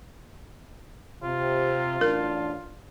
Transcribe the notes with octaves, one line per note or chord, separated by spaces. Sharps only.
C3 F4
A1 D4 A#4